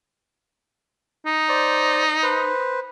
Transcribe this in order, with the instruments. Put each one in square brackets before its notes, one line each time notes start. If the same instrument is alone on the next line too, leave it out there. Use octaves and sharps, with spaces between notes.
[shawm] D#4
[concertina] C5 D5
B4 C5